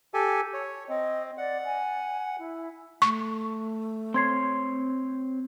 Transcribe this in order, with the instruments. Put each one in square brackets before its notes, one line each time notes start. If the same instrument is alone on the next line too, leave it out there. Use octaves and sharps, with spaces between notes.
[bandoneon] G4 A4 G#5
C#5
[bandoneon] C4 [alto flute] D#5
[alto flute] D5 [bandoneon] F#5
[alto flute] G#5
E4
[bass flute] A3 [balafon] C#6
[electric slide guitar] C4 C#5 [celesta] C6 G#6 C7